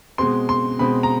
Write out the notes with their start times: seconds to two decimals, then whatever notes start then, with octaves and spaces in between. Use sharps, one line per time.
0.18 B2 G#3 C4 C6
0.49 C6
0.79 B2 G#3 C4 B5
1.03 A#5